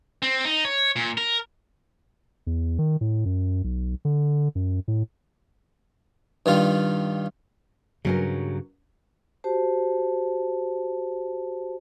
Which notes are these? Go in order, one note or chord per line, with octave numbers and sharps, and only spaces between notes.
C4
D#4
C#5
A#2
A#4
E2
D#3
A2
F#2
B1
D3
F#2
A2
G2 D#3 F4
G2 C#3 F#3 C#4 A#4
F#4 G4 C5 A5